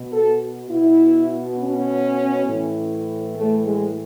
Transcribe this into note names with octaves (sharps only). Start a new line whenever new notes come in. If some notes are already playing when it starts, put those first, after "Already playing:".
Already playing: B2
A4
B2 E4
C#4
A2 E3
A3
G#3